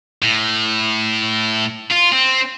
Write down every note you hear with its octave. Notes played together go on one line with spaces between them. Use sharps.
A2
F4
C4